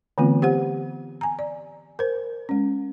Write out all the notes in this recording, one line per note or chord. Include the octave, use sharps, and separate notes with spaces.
D3 E3 A3 B3 C4 F4
G4 C5 F#5
G#5 A#5
D5
A#4 C5
G#3 C#4